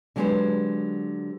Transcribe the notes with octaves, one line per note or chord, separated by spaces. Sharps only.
D3 F#3 G#3 G4 B4 C5